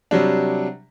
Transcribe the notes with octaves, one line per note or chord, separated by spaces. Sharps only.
C3 F#3 G3 D4